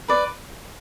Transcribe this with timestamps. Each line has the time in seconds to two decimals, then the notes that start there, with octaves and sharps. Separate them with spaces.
0.08 B4 D5